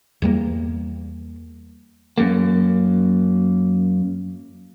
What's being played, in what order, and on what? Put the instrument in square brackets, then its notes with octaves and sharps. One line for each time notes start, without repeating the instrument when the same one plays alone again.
[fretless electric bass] E2 G3 A#3
[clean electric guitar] F#2 A#3